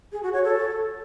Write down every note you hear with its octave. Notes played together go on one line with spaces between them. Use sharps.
G#4
F#4
C#5
A4